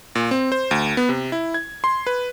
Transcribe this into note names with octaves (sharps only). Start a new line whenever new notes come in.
A#2
C4
C5
D2
B3
C3
E4
G#6
C6
B4